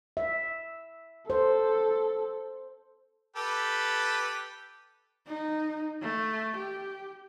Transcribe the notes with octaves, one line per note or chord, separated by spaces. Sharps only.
E5
A4 C5
G4 A4 B4
D#4
A3
G4